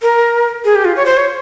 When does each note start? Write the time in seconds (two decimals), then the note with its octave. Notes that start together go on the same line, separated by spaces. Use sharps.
0.02 A#4
0.65 G#4
0.75 G4
0.85 F4
0.96 C#5
1.06 C5
1.17 C#5